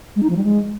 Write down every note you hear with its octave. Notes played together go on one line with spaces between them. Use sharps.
G#3
D#4
F3
G3
G#3